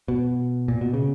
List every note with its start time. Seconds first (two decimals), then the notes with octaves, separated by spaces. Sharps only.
0.08 B2
0.68 A#2
0.81 B2
0.94 C#3